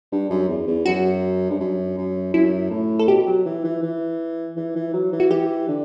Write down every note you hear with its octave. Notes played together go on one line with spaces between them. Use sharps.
G2
F#2
E2
E2
F#2 F#4
G2
F#2
F#2
F#2 E4
A2
A4
B2 G4
F#3
E3
E3
E3
E3
E3
F#3
E3
F#4
E3 G4
D3